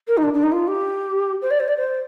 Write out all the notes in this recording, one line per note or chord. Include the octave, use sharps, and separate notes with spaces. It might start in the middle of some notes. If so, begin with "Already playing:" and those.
A#4
D#4
D4
D4
D#4
F4
G4
C5
D5
C5
D5
C5